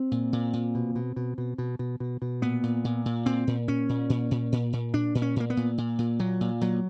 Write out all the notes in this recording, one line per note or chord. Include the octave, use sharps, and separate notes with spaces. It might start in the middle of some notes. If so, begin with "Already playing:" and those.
Already playing: C4
A#2
A#2
A#2
B2
B2
B2
B2
B2
B2
B2
B2
A#2 B3
A#2
A#2
A#2
A#2 C4
A#2
A#2 C#4
A#2
A#2
A#2
A#2
A#2
A#2 D4
A#2
C#4
A#2 A#3
B3
A#2
A#2
A#2
A#2 F#3
A#2
A#2 F#3